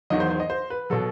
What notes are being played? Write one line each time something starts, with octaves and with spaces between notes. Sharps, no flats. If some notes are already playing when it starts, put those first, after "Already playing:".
E2 D#3 F#3 D#5
C5
C5
D#5
C5
B4
B2 F#3 A4